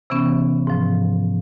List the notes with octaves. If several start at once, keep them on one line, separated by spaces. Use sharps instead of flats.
C3 E3 B3 C#4
G#2 F3